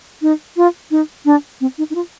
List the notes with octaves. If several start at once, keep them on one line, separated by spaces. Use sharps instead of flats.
D#4
F4
D#4
D4
C4
D#4
D#4
F4